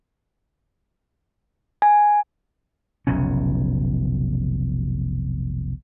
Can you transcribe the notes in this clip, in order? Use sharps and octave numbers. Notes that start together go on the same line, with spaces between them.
G#5
F1 B1 C#3 C#4